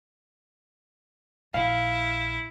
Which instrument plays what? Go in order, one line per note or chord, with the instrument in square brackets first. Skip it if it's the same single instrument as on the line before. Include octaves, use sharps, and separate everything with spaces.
[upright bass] A#1 [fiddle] E4 [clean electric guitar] F5